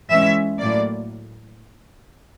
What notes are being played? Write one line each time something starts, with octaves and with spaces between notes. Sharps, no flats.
E3 G#3 C#4 E5
A2 F#3 A#3 D5